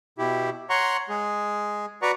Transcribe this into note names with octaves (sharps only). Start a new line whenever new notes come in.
B2 E4 G4
C#5 F#5 A#5 C6 C#6
G#3 G#4
F#4 B4 D5 F#5 A#5 C#6